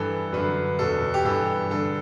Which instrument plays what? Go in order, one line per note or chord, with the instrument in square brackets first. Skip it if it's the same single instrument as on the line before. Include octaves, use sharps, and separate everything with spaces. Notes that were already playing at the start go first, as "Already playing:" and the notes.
Already playing: [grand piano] G2 E3 A4
F#2 D3 B4
E2 B2 A4
G4
G2 E3 A4
G2 D3 A4